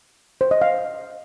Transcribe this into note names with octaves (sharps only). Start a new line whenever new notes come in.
C5
D#5
F5